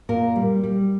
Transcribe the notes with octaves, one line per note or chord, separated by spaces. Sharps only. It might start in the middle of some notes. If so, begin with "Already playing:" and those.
A#2 A#4
G3
G3